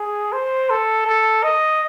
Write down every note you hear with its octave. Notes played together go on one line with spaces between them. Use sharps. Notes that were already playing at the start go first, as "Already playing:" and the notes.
Already playing: G#4
C5
A4
A4
D#5